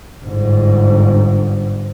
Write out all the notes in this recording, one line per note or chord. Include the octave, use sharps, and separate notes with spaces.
G1 G#2